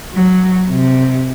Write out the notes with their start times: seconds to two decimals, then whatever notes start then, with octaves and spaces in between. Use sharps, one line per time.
0.14 F#3
0.70 C3